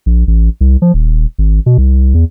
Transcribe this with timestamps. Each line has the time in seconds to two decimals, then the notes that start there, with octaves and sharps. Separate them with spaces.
0.06 A#1
0.28 A1
0.61 C2
0.82 F3
0.94 D#1
1.39 G#1
1.66 B2
1.78 C2
2.14 E2